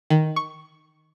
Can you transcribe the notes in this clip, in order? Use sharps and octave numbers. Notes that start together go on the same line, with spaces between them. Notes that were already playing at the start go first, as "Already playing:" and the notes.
D#3
C#6